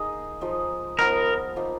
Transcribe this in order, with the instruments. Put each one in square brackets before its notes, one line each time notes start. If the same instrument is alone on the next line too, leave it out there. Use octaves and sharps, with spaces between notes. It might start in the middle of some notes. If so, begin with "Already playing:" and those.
Already playing: [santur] A#3 D#4 G#4 D#5
F3 G#3 D#4
[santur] F3 B3 D#4 [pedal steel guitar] A#4
[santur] F3 A#3 D#4